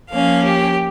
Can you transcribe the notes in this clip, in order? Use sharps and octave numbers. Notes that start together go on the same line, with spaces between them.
F3 A#3 C#4 F5
G4